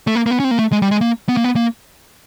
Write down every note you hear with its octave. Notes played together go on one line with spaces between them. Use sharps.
A3
A#3
A#3
B3
C#4
C4
A#3
A3
G#3
G3
G#3
A#3
B3
A#3
B3
A#3